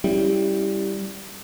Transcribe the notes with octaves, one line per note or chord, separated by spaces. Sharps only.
G3 C#4 E4 G4